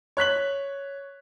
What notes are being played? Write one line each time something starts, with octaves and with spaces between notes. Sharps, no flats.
C#5 F#6 B6 F#7